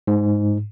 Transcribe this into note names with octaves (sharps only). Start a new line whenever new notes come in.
G#2